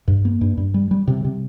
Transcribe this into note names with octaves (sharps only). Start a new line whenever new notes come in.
G2
A#3
G2
G2
G3
G3
C3
C3